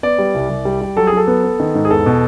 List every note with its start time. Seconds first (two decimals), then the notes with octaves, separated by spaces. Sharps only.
0.03 B3 D5
0.19 G3
0.34 C2
0.50 C2
0.65 G3
0.81 G3
0.96 F#3 A4
1.07 G#4
1.12 F#3 A4
1.27 B3
1.44 B3
1.60 D#3
1.75 G#2
1.85 G#4
1.91 E2 A4
2.06 B2